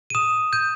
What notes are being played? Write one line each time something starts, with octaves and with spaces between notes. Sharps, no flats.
D#7
D#6 E7
G6 D#7